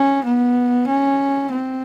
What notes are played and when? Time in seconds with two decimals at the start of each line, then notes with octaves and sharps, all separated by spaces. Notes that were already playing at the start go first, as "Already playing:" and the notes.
Already playing: C#4
0.25 B3
0.87 C#4
1.52 C4